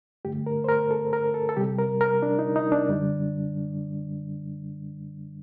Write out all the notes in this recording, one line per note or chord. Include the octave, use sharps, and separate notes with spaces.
G2 D3 A3 G4
A#4
C5
A#4
A4
A#4
A4
A4
C3 G3 G4
A#4
A#4
D4
D#4
D#4
D4
F#2 D3 G3